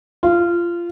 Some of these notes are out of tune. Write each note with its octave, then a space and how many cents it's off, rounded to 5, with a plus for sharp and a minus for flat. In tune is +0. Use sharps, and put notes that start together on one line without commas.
F4 -20